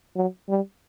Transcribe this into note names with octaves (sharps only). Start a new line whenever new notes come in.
F#3
G3